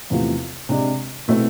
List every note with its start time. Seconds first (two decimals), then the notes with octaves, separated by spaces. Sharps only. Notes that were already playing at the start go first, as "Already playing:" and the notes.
0.10 E2 C3 F3 A3
0.69 C3 G#3 D4
1.28 B2 A3 C4 E4